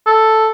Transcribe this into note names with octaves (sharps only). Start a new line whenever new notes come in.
A4